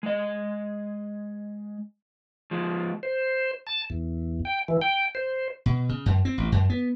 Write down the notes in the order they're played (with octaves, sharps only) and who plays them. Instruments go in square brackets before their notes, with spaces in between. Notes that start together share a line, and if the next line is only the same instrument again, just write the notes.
[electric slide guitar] G#3 D#5
F3 G#3
[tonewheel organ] C5
A5
E2
G5
E3
G5
C5
[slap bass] B2
C#3
F#2
C4
A1
F#2
B3